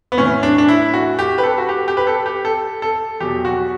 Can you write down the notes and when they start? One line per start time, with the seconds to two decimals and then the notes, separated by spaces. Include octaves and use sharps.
0.12 B3
0.18 A2 E3 C#4
0.43 D4
0.58 D4
0.69 E4
0.94 F#4
1.19 G4
1.38 B4
1.44 A4
1.58 F#4
1.69 G4
1.88 G4
1.97 B4
2.07 A4
2.26 G4
2.45 A4
2.82 A4
3.20 E2 B2 F#3 G4
3.45 F#4